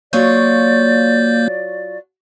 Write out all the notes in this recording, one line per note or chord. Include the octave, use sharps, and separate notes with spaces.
F#3 A#3 F4 C#5 D5 G6